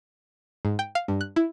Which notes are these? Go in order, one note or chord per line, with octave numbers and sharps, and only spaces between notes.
G#2
G5
F5
G2
F#6
E4